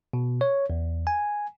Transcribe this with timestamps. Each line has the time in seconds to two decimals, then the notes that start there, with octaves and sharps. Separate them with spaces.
0.13 B2
0.41 C#5
0.70 E2
1.07 G#5